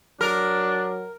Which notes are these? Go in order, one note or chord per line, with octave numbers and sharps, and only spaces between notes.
F#3 D4 A#4